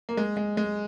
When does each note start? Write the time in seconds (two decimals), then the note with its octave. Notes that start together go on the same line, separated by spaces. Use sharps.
0.09 A#3
0.17 G#3
0.37 G#3
0.57 G#3